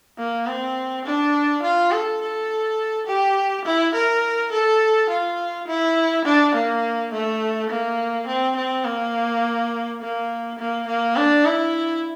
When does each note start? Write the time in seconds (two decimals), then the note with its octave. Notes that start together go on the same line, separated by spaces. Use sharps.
0.18 A#3
0.47 C4
1.05 D4
1.63 F4
1.92 A4
2.21 A4
3.07 G4
3.65 E4
3.94 A#4
4.52 A4
5.10 F4
5.67 E4
6.25 D4
6.55 A#3
7.12 A3
7.70 A#3
8.27 C4
8.56 C4
8.85 A#3
10.01 A#3
10.59 A#3
10.88 A#3
11.16 D4
11.45 E4